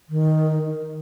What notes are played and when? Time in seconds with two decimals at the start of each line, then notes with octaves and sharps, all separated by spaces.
0.09 D#3